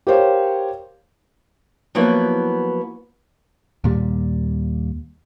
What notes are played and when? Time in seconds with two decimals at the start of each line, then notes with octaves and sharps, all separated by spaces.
0.07 G4 A#4 C5 C#5 F5
1.95 F3 F#3 A#3 B3 E4
3.84 D#2 A#2 G3